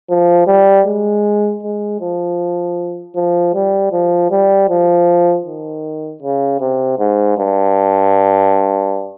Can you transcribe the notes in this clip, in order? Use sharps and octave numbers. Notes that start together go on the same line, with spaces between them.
F3
G3
G#3
G#3
F3
F3
G3
F3
G3
F3
D#3
C#3
C3
G#2
G2